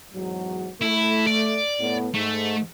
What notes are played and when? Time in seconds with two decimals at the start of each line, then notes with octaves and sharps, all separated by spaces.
0.13 E2 G#2 F#3
0.81 A3 E4
1.27 D5
1.80 A2 B3
2.14 G#2 A3